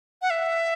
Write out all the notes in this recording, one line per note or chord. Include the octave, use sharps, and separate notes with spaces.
F#5
E5